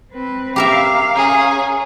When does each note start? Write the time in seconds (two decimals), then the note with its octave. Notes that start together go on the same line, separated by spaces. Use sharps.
0.12 C4 B4
0.56 G4 A#4 E5 F5 A#5
1.15 C#4 G#4